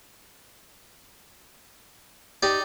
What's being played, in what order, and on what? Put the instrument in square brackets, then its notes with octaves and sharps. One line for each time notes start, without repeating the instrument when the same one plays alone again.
[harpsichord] D#4 D5 [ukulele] G4